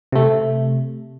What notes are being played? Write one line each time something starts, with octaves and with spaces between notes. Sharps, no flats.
C3 A3